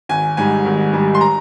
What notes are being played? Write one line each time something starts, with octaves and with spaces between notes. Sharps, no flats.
G#1 G#5
G#2 G3 G#5
G#1
G#2 G3
C6
A#5